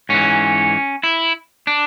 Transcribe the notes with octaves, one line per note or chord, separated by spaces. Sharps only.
G#2 E3 C#4
E4
D4